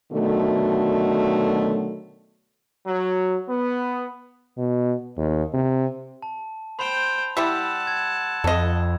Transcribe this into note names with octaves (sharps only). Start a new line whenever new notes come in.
B2 D3 D#3 F#3 A3
F#3
B3
B2
D#2
C3
A5
C5 G5 B5 C6 F7
G3 E4 G4 F#5 A5 E6
G#6
F2 A4 D#5